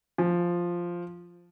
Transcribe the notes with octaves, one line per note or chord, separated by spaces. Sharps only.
F3